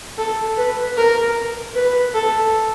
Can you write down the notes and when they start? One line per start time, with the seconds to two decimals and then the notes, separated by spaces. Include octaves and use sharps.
0.18 A4
0.57 B4
0.97 A#4
1.75 B4
2.14 A4